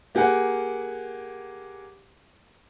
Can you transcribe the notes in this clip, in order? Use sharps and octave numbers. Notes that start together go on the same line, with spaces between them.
A#3 G4 G#4 F#5